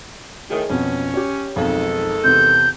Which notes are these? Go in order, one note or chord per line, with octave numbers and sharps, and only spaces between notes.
A2 D#3 G#4
F2 B2 C#4
G4 C#5
B1 F2 D#3 G#3 A4
E2 C3 C4 G6